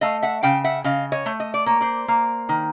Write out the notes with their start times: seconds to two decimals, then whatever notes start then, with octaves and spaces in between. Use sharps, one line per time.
0.01 A3 D#5 F5
0.22 E5 F#5
0.43 C#3 F5 G5
0.64 E5 F#5
0.84 C#3 D#5 F5
1.12 C#5 D#5
1.26 A3
1.40 D#5
1.54 D5
1.66 A#3 C#5
1.81 C5 D5
2.08 A#3
2.49 D#3